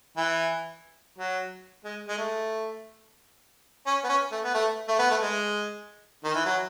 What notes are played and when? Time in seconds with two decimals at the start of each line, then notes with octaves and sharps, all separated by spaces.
0.17 E3
1.18 F#3
1.84 G#3
2.08 G#3
2.18 A3
3.87 C#4
4.04 B3
4.09 C#4
4.32 A3
4.43 B3
4.54 A3
4.88 A3
4.99 B3
5.10 A3
5.22 G#3
6.24 D#3
6.34 E3
6.45 F#3